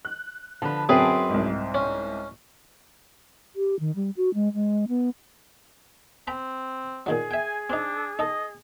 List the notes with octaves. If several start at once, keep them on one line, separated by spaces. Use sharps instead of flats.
F#6
D3 F3 B4 A5
F#2 C4 G#4 B4
C2 G#2
C#4
G4
D#3
G3
F#4
G#3
G#3
B3
C4 G5 A#5 B5
A#2 D#3 F#3 G#4
E5 G5 G#5
C4 D4 D#4
D#4 A4 D#5